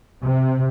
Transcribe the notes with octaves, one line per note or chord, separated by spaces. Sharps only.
C3